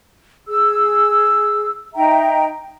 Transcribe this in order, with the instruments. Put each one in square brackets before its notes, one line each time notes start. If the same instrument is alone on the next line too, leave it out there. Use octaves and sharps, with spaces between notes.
[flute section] G#4 E6
D#4 E5 G5 A#5